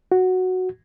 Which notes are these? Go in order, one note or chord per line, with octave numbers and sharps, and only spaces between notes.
F#4